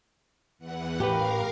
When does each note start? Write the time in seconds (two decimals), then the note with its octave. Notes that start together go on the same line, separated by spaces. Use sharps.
0.59 E2 E3 F#5
1.00 A1 G4 A#4 B4 F5